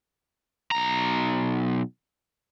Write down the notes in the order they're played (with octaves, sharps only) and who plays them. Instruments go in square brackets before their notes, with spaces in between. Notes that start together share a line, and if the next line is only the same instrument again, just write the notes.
[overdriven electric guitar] B1 A#5